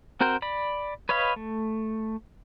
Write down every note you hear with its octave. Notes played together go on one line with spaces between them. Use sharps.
C4 F#4 A#4 C5 G5
D5 B5
B4 C#5 D#5 F5 B5
A3